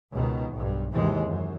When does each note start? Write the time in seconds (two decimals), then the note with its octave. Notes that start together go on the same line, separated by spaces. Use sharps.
0.11 C#2 B2 D#3
0.52 B1 G2
0.93 D#2 G#2 C3 E3 G#3
1.24 F#2